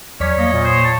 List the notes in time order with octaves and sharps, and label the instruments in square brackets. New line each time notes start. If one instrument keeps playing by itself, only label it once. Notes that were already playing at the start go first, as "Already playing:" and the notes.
[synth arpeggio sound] E2 D5 B6 [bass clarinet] F#3 [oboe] C#4 [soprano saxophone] C#5
[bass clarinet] A#3 [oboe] D#5
[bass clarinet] A#2
[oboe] C5
A5